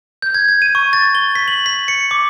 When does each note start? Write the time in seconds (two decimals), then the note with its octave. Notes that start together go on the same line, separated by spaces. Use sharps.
0.22 G6
0.34 G#6
0.49 G#6
0.62 D#7
0.75 C#6
0.93 A6
1.15 G7
1.35 B6
1.48 F#7
1.66 B6
1.88 C#7
2.11 D6